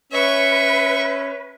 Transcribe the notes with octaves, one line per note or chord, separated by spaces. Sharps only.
C#4 B4 E5 C#6